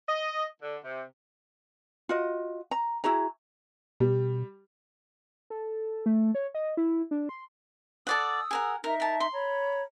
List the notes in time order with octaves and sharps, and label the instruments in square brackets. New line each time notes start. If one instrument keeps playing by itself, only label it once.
[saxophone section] D#5
D3
C3
[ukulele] F4 F#4 D#5
A#5
E4 F#4 G#4 A#5
[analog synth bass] B2 [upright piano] G3
[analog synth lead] A4
A3
C#5
D#5
E4
D4
C6
[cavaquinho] A4 D5 F#5 [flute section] D#6 E6
[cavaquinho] G#4 A#4 F#5
[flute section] D#4 E5 [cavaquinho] A#4
[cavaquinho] A#4 A5
C6
[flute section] C#5 A#5 B5